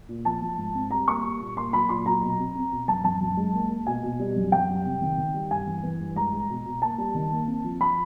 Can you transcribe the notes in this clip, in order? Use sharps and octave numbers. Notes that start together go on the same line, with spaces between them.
A#2
F3 A5
F3
G#2
C4
G3 A#5
A#3 C#6
G3
A#2
A#3 C6
F#3 B5
A#2 C6
F#3 A#5
B2
C4
C4
B2
F#2 A5
F#2 A5
F#2
G#3
A#3
A#3
B2 G#5
B2
G3
F#2
F#2 G5
G3
C3
D#3
D#3
G3
G2 G#5
E3
E3
G2
G#3 A#5
G#3
B2
B2
A#3 A5
G3
D#3
A#3
C4
F3
F3 B5